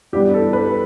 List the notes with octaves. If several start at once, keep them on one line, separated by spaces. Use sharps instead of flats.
G2 E3 G3 B3 D4 G4
A4
B4